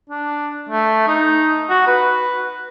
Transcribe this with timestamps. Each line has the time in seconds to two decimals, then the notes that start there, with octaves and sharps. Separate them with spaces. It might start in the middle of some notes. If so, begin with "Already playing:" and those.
0.10 D4
0.69 A3
1.08 D#4
1.70 F#4
1.87 B4